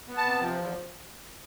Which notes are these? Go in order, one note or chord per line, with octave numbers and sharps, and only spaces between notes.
B3
A5
C3
F3
E2